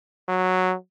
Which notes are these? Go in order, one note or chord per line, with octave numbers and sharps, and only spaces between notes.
F#3